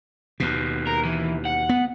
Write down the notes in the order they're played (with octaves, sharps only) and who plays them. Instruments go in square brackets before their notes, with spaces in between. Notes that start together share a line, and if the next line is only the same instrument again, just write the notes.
[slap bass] D#2 B2
[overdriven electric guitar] A#4
E3
F#5
[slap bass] B3